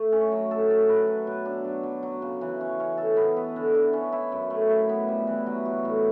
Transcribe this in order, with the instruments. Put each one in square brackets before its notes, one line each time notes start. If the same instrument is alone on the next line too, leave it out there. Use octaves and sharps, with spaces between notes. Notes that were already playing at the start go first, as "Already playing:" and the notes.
Already playing: [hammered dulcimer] A3
C#4
F#3
A4
A4
B4
F#3
B2
D4
F#3
F#3
F#3
C#3
E3
C#4
C#4
A4
B3
B3
D3
E4
C#4
E4
F#2
A3
E4
B3
G3
E3
F#3
F#4
A2